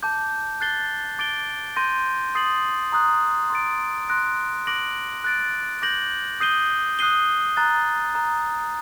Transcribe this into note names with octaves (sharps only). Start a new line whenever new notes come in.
A5 D6 G6
F#6 A6 C7 G7
D6 A6 D7 G7
C6 G6 A#6 D#7
C6 D#6 A6 C7 F#7
A#5 D#6 F#6
C6 D#6 A6 D7
C6 F#6 A#6 D7
D6 F#6 A#6 D7 F#7
F#6 A6 D7
D6 G6 A#6 F#7
D#6 G6 C7 D#7 G7
D#6 F#6 C7 D#7 G7
A#5 F#6 A6
A#5 D#6 F#6